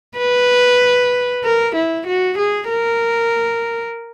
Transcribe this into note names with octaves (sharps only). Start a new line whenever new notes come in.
B4
A#4
E4
F#4
G#4
A#4